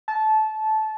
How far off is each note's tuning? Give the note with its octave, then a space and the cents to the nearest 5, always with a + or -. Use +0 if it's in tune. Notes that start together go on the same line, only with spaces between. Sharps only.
A5 -20